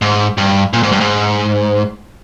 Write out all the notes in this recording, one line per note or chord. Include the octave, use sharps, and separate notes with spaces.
G#2
G2
A#2
G#2
G2
G#2